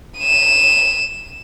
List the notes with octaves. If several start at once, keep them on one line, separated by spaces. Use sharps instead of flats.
D#7 E7